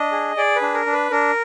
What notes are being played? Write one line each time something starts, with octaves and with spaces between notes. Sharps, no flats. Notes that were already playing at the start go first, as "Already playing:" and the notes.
Already playing: D4 D#5
G#4
G#4 D5
B4
D4
A#4
D4
B4
D4 A#4